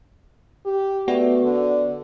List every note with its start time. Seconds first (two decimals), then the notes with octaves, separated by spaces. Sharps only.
0.65 G4
1.08 A3 B3 F#4 D5
1.42 D3